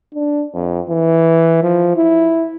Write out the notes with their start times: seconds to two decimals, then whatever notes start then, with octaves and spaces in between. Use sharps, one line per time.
0.14 D4
0.54 F2
0.89 E3
1.63 F3
1.96 E4